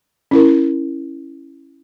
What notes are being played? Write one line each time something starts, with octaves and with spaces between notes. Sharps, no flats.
C#4 E4 A#4